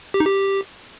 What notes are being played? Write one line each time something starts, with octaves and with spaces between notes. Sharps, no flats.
G4
D#4
G4